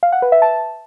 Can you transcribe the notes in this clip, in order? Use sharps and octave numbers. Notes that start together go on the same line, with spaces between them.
F5
F#5
B4
E5
A5